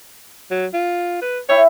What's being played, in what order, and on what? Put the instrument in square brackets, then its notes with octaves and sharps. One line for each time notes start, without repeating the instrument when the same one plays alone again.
[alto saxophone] F#3
F4
B4
[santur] E4 E5 G5 [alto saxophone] C#5